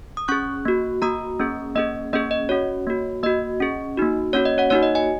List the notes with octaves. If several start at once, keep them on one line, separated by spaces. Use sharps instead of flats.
D#6
C#4 G#4 C#6 F#6
A#3 F#4
A#3 F#4 A#5 D#6
A#3 C#4 G#4
A#3 C#4 G#4 D#5
A#3 C#4 G#4 D#5
D#5
C#4 F#4 C#5
A#3 F#4
A#3 F#4 D#5
C#4 G#4
A#3 D#4 F#4
A#3 C#4 F#4 C#5
D#5
C#5 F#5
A#3 D#4 F#4 C#5
D#5
D#5 G#5